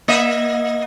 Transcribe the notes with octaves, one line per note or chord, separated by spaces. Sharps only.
A#3 D#5 E5